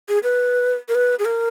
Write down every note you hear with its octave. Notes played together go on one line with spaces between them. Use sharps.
G#4
B4
A#4
B4
G#4
A#4